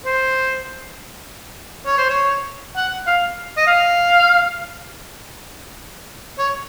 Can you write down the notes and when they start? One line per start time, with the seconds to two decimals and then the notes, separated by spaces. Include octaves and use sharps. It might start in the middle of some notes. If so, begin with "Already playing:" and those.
0.05 C5
1.86 C#5
1.98 C5
2.10 C#5
2.76 F#5
3.07 F5
3.57 D#5
3.67 F5
6.39 C#5